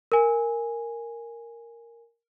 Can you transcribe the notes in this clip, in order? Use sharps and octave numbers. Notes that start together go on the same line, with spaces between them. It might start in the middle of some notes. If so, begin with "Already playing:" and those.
A#4 G#5